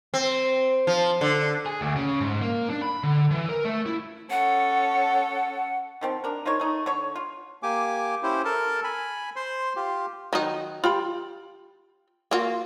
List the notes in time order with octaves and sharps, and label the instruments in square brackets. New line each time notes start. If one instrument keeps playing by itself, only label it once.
[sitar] C4
F3
D3
[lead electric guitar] G#4
D2
C#3
G#2
A#3
D4
B5
D3
E3
A#4
A3
E4
[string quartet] C#4 A4 C#5 [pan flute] F#5
[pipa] D#3 F3 C4
D4 A#4
D#4 F4 A#4 C#5
A3 D#4
D3 C#5
F4
[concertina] A#3 G4 G#5 D6
C#4 E4 G4 C5
A4 A#4 A5
G#5 B5
C5 C6
F4 G4
[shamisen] D#3 F#3 D#4
F4 G4 B5
A#3 F4 F#4